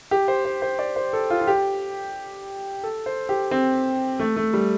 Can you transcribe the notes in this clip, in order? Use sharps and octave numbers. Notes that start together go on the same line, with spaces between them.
G4
C5
C5
C5
D5
C5
A4
F4
F4
G4
A4
C5
G4
C4
A3
A3
G3